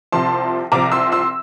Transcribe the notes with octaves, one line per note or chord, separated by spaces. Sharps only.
C2 C3 F3 A5 C6
C2 C3 F3 A#5 D6
C6 E6
C6 E6